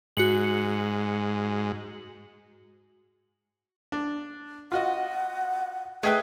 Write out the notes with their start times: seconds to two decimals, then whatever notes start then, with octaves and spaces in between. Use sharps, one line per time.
0.17 G#2 F#4 C#7 F#7
3.92 D4
4.72 F4 F#4 D#5 F#5
6.03 A3 G#4 B4 D#5 G5 F#6